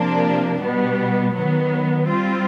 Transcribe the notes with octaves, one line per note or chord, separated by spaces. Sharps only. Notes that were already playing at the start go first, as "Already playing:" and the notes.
Already playing: C3 F3 A#3 D4
B2 G3 B3
D#3 F#3 B3
G3 C4 F4